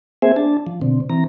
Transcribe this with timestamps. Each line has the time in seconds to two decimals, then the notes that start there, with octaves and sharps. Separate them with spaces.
0.22 A#3 C4 G#4 C5 E5 G#5
0.36 D4 A5
0.67 F3
0.82 B2 D3 C4
1.10 E3 C4 A#5